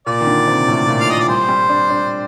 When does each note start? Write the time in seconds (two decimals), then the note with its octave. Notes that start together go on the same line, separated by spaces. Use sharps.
0.07 A#2 D5
0.21 D#3
0.27 D3
0.47 C3
0.68 A2
0.88 A#2
1.01 F5
1.09 A#2 D#5
1.20 D5
1.28 G3 C5
1.49 G3
1.69 D4
1.90 D4